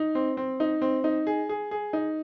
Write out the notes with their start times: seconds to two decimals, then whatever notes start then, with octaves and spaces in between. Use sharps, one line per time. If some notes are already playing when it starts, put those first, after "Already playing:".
Already playing: D#4
0.15 C4
0.37 C4
0.60 D#4
0.82 C4
1.04 D#4
1.27 G#4
1.49 G#4
1.71 G#4
1.93 D#4